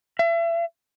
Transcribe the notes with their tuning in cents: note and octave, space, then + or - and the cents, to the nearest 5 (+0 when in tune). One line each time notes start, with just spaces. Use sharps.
E5 +35